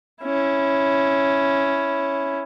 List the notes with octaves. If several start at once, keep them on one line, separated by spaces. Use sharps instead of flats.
C#4 E4